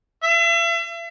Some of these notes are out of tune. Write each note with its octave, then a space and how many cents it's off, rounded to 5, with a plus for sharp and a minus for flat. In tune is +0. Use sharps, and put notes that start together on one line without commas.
E5 +40